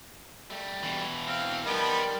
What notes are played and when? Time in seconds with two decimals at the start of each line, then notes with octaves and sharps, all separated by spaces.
0.50 G3 A3
0.83 B2 E3
1.27 C4 F5
1.66 D#3 F3 G3 B3 D#5 G5